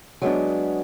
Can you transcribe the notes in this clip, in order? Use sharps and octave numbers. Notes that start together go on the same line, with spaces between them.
F#3 G#3 B3 D4